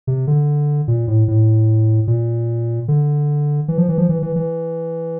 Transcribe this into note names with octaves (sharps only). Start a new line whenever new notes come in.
C3
D3
A#2
A2
A2
A#2
D3
E3
F3
E3
F3
E3
E3
E3